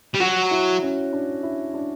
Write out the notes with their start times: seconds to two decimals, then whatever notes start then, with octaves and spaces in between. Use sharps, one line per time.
0.14 G3
0.20 F#3 F#4
0.51 E4
0.83 C#4
1.13 D4
1.43 E4
1.74 D4